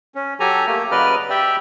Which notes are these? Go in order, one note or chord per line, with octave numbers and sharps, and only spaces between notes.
C#4
F#3 G4 A4 G#5 A#5
A3 A#3 G4
C#3 F#3 B4 D5 D#5 F6
G4 D5 E5 G5